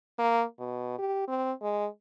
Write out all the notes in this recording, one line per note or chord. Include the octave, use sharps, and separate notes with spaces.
A#3
B2
G4
C4
G#3